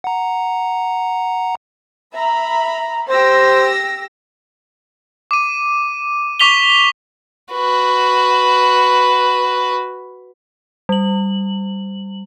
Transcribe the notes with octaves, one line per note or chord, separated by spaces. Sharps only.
F#5 A#5
E5 A#5 B5
G4 C5 E6 A#6
D6 D#7
C#6 D6 B6 F7 G7
F#4 B4
G3 F#7